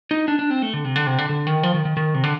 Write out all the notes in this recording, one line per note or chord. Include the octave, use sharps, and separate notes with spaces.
D#4
D4
D4
C4
A3
D3
C3
D3
C3
D3
D3
D#3
F3
D#3
D#3
D#3
C3
D3